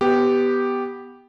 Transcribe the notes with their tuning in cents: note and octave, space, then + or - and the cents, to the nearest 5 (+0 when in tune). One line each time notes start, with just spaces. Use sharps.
B3 +0 G4 +0